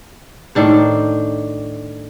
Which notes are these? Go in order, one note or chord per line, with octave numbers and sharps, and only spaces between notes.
A2 D#3 D4 C5